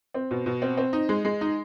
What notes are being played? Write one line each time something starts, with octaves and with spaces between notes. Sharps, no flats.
C4
B2
B2
C4
C4
D#4
G#3
G#3
D#4